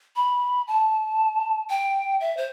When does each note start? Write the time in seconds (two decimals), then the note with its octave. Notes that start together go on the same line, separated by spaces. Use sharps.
0.16 B5
0.67 A5
1.70 G5
2.20 E5
2.37 C5